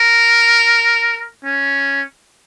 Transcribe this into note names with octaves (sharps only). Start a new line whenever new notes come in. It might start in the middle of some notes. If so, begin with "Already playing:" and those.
Already playing: A#4
C#4